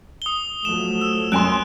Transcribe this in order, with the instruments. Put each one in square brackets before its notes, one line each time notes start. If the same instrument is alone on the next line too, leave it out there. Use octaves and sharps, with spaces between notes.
[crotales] D#6 G7
[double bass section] F3 F#3 A3 [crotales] E7
[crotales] E6
[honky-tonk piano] F#2 G#5 C6 [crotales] F#6 D7 E7